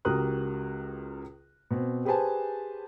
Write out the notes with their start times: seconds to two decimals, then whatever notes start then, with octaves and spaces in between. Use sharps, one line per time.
0.05 C#2 F#4 G4 A#4 D#6 F#6
1.71 B2 C4
2.05 G4 G#4 B4 C5 G#5 A5